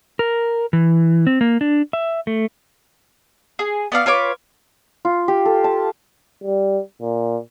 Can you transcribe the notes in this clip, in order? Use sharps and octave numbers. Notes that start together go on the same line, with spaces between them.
A#4
E3
C4
A#3
D4
E5
A3
G#4
B3 D5 F5
F4 B4 C#5 D6
F4
G4
A4
A5
G3
A#2